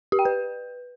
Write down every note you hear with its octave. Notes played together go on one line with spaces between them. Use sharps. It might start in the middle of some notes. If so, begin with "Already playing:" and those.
G4
G5
B4